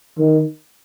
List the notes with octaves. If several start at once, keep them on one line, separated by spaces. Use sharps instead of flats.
D#3